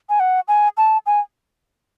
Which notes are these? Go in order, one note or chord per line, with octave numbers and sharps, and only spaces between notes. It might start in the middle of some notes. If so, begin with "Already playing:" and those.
G#5
F#5
G#5
A5
G#5